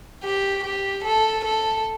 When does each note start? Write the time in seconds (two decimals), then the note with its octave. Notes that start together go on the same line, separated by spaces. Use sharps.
0.23 G4
0.63 G4
1.04 A4
1.44 A4